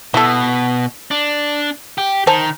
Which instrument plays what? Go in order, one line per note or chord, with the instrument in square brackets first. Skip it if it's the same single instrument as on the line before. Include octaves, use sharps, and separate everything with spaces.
[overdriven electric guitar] B2 [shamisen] E4 A4
[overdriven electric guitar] D4
G4
[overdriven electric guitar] D#3 [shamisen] C5 G#5 A5